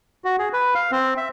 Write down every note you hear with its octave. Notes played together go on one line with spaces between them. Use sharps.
F#4
G#4
B4
F5
C4
E5